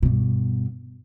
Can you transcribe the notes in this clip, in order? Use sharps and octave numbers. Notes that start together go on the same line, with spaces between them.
G2 B2